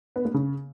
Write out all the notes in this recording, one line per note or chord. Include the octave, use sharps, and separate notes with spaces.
B3
A#3
C#3